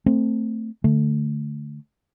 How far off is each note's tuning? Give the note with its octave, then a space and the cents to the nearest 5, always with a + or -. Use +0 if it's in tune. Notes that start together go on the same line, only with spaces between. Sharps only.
A3 +25 C4 +10
D3 +0 A3 +0